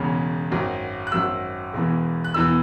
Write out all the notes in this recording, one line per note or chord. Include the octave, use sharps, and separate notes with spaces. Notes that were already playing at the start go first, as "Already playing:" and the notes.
Already playing: E1 E2 C#3
G#1 F#2 F#3
F#6
G#1 F#2 F#3 E6
E1 E2 E3
F#6
E1 E2 E3 E6